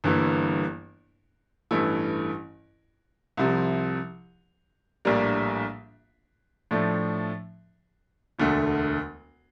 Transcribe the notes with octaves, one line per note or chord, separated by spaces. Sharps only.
G1 G2 E3 A#3 E4
A1 G2 E3 A3 E4
C2 C3 F3
A#1 A2 G3 A#3 D4
A2 F3 A3 D4
E1 D2 D3 A3